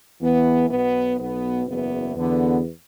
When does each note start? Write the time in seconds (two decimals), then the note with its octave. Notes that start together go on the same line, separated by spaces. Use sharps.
0.21 E2 E3 B3
0.70 B1 B2 B3
1.19 B1 B2 B3
1.68 F#1 E2 E3 B3
2.16 E2 D3 B3